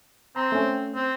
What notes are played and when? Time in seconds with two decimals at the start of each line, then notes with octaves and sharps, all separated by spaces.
0.36 C4 A#5 C6
0.52 A3 C#4
0.95 C4